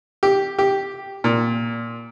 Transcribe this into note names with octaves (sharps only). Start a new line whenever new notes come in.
G4
G4
A#2